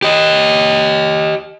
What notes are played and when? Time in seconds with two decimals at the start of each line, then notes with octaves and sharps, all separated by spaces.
0.02 G4 D#5